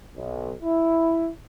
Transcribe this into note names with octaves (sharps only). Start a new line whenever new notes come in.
B1
E4